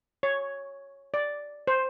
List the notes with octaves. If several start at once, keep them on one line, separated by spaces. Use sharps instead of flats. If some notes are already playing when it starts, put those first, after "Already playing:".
C#5
D5
C5